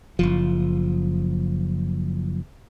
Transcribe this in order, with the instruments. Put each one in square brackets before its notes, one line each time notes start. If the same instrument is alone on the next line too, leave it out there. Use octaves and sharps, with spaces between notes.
[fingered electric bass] F#1 C#2 F3